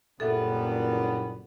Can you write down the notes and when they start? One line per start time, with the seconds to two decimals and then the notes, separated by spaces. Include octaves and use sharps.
0.20 F#1 G2 A#2 G3 B3 A4 E5